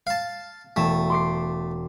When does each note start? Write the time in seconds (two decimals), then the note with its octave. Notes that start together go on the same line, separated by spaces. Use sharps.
0.07 F5 A5
0.76 E1 A3 E7
1.10 C6 D6 C7